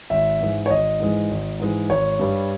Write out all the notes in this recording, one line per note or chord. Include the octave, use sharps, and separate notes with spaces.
G#1 E5
G#2 E3 G#3
C#5
G#1 D#5
G#2 E3 G#3
G#1
G#2 E3 G#3
G#1 C#5
G2 G3